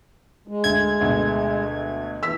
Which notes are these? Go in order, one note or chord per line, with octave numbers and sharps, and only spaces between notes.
G#3
D2 G#6
D2 B2
E3 E6 B6